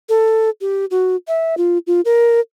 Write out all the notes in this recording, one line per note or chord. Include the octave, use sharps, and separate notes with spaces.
A4
G4
F#4
E5
F4
F4
A#4